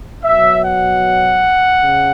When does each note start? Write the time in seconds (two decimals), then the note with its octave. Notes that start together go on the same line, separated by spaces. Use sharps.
0.24 B2 F#3 E5
0.64 F#5
1.82 C#3